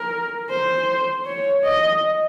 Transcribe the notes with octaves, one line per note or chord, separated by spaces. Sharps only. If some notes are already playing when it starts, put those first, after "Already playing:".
Already playing: A#4
C5
C#5
D#5